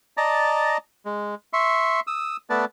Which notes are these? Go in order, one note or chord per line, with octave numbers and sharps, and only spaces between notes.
D5 D#5 A5 A#5
G#3
E5 C6 C#6
D#6 E6
A3 B3 B4 D5 A5